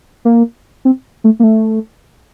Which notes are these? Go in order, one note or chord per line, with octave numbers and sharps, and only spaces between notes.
A#3
C4
A3
A#3
A3